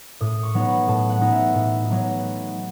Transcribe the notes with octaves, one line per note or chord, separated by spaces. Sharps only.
A2 D#6
C#6
F#3 B3 D#4
B5
A2 A5
F#5
F#3 B3 D#4
E5
A2
F#3 B3 D#4